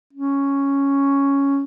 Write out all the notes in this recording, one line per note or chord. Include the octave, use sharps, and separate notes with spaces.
C#4